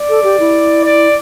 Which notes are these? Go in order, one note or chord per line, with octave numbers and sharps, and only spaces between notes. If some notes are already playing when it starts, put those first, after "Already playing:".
Already playing: D5
A4
G4
E4
D5